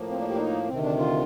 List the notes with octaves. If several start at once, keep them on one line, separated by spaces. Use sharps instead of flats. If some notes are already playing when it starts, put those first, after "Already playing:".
Already playing: A2 F3 A#3
C4
D4
G4
D4
D#4
D2 C3 D#3 C4
D4
F4